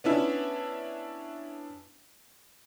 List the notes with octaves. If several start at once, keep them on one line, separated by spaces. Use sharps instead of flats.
B3 C#4 D4 E4